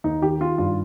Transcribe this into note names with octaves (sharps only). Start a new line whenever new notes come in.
D#2 D#4
D#3 G4
D#3 F4
G2 F4